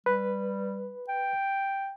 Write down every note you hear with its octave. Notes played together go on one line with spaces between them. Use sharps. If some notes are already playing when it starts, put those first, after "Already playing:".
G3 B4
G5